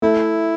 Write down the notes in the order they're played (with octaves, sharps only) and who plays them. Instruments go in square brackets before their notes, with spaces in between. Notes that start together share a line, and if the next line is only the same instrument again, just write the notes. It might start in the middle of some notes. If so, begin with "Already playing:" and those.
[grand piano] A3 [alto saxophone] E4